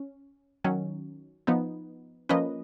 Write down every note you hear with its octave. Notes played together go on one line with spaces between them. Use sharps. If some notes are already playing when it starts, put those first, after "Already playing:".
Already playing: C#4
D#3 F#3 C#4
F3 B3 D#4
F3 A#3 C#4 B4 D#5